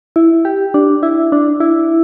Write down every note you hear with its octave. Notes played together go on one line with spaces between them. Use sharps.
E4
G4
D4
E4
D4
E4